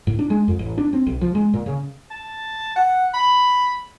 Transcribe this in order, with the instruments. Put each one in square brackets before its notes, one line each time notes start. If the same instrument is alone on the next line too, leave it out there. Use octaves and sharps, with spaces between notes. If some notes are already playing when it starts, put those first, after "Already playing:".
[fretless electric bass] A2
D4
G#3
F2
A1
D4
C4
B1
F3
G#3
A#2
C#3
[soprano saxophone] A5
F#5
B5